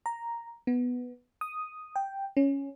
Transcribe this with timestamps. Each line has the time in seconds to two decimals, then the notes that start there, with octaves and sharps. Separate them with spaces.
0.06 A#5
0.67 B3
1.41 D#6
1.96 G5
2.37 C#4